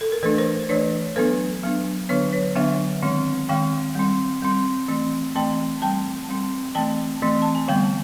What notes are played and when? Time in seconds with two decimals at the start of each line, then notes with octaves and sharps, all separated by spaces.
0.01 A4
0.12 A#4
0.23 E3 A3 D4 A4 B4
0.38 A#4 C5
0.69 E3 A3 D4 B4 C#5
1.16 F#3 B3 D4 A4 B4
1.63 F#3 B3 D4
2.09 D3 F#3 B3 D4 B4 C#5
2.33 B4 C#5
2.55 D3 F#3 B3 D4 E5 F#5
3.03 D#3 G#3 C4
3.49 D#3 G#3 C4 F5 G5
3.95 G3 C4
4.42 G3 C4
4.88 E3 A3 C4
5.35 E3 A3 C4 G5 A5
5.82 G3 C4 G5 A5
6.28 G3 C4
6.75 E3 A3 C4 G5 A5
7.22 E3 A3 C4
7.42 A5
7.55 G#5
7.68 D3 G3 B3 F5 G5